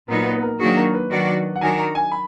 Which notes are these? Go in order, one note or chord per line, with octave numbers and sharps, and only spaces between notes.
A#2 F#3 B3 D#4 A#4
B4
B4
A#4
D#3 F#3 A#3 D4 F#4 G#4
A#4
B4
D#3 F#3 D4 F#4 D5
F#5
D#3 F#3 D4 F#4 A#4 G#5
A#5
G#5
B5